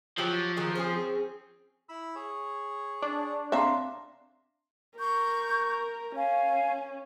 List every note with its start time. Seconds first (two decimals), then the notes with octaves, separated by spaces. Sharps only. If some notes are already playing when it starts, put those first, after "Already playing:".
0.18 F3 F#3 G4
0.57 D#3 F#3 G#4
0.75 C4 C#4 G#4
1.89 E4 B5 E6
2.15 G#4 C#5
3.02 D4
3.52 C4 E5 F5 A#5 C6
4.98 A#4 C#6 G6
6.16 C#4 F5 G#5